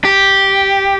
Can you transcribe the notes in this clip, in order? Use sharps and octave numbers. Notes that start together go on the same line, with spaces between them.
G4